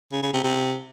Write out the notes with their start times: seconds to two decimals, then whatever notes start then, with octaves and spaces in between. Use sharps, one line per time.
0.12 C#3
0.23 C#3
0.33 C3
0.44 C3